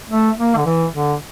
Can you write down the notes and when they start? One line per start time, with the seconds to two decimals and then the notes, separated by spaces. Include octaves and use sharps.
0.10 A3
0.38 A#3
0.57 D3
0.66 E3
0.94 D3